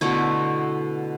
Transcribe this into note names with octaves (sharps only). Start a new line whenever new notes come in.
B2 D3 A3 E4